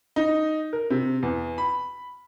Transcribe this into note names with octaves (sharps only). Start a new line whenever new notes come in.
D#4
A#4
C3
E2
B5